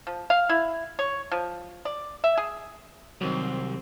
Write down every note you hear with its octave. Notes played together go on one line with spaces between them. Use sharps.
F3
F5
E4
C#5
F3
D5
E5
G#4
C2 D#3 F#3 C4